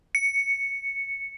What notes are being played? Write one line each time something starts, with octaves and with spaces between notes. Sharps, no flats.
C#7